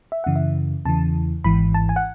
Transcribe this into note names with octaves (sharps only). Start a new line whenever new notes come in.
E5
F#2 C#3 E3 F#5
E5
E2 C#3 E3 A5
G#1 G#2 E3 B5
A5
G#5
F#5